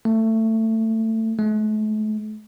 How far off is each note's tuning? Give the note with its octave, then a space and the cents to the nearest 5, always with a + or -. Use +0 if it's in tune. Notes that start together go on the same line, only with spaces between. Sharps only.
A3 +20
A3 -40